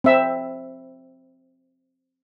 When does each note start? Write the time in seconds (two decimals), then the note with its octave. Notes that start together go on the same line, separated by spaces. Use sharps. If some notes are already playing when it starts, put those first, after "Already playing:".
0.04 C4 E5